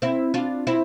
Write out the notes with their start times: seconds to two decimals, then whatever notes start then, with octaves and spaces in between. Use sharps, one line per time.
0.02 C4 E4
0.34 D4 F4
0.67 C4 E4